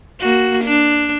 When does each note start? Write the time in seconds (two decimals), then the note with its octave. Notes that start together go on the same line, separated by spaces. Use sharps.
0.20 A#3 F#4
0.65 D4